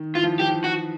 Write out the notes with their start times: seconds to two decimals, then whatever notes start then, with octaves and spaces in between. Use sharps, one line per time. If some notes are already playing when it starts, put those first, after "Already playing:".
Already playing: D#3
0.15 E3 F4
0.24 F3
0.33 E3
0.39 F3 G4
0.49 E3
0.64 F#4